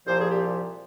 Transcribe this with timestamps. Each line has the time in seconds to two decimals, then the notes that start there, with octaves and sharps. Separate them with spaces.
0.07 C2 A#2 F3 C5
0.19 G#4
0.30 G4